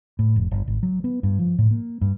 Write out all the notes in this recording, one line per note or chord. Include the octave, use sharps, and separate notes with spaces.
A2
F1
G1
G#1
F#3
B3
G2
F3
A2
A#3
G2